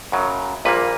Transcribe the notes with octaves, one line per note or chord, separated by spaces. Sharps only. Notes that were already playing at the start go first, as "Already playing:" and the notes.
F#2 C#3 F#3
A#1 A#2 G3 A#3 B4